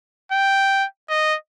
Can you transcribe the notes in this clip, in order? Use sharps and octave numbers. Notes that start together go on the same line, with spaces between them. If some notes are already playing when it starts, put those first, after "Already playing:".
G5
D#5